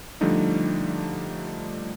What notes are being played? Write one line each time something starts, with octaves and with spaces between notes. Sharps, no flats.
D3 F3 G3 A3 D4 D#4